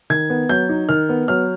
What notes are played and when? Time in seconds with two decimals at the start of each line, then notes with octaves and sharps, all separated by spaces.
0.10 D#3 G#6
0.30 B3
0.49 F#3 G6
0.69 D#4
0.89 D#3 F6
1.09 B3
1.28 F#3 F6